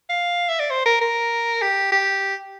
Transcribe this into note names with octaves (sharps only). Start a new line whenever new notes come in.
F5
E5
D5
C5
A#4
A#4
G4
G4